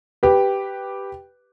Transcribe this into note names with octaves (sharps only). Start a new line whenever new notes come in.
G4 B4